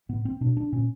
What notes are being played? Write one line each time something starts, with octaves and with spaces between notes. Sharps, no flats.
A2 B3
C4
B2 D4
D4
A#2 C#4